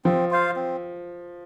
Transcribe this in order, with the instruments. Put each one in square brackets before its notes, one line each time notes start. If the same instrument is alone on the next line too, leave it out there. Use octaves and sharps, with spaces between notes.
[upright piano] F3 [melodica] C4
[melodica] F4 C5 F5
C4